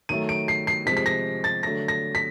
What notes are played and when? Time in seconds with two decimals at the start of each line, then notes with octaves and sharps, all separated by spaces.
0.09 D#3 F#3 A3 D#7
0.29 D7
0.48 C7
0.67 C7
0.86 C3 F3 G#3 B6
0.97 B6
1.06 A#6
1.44 A6
1.63 D3 F#3 A3 A#6
1.88 A#6
2.15 B6